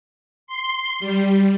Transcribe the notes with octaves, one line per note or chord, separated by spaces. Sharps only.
C6
G3